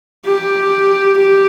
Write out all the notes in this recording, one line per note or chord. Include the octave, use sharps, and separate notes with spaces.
G4
G4